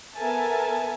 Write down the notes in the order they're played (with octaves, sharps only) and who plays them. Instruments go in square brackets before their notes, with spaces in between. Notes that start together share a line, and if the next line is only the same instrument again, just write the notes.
[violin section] B3 A4 A#4 E5 G#5 A5